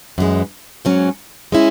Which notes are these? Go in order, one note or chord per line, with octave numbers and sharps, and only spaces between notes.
F#2 E3 G#3
G#2 F#3 C#4
G#3 C#4 E4